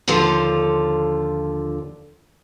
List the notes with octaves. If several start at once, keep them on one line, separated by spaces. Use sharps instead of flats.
D#2 D3 F3 F4 A4